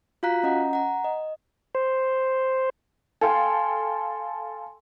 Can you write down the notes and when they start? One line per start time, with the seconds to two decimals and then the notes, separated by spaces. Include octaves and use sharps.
0.23 F4 F#4 F5 A#5 F#6 B6
0.43 C#4 D#5 F#5 A#5
0.73 F#5 A#5
1.04 D#5
1.75 C5
3.21 A4 F5 G5 G#5 C6